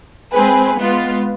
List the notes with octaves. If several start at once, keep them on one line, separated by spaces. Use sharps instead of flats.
G#3 C4 G#4 B4
G#3 B3 F4